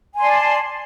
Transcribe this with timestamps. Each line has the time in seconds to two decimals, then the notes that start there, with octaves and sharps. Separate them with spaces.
0.14 G#5
0.18 C6
0.21 D5
0.25 A5